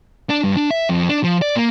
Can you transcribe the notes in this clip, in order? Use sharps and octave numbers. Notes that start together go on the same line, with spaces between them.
D4
G2
D4
E5
F2
D4
F3
D5
A#3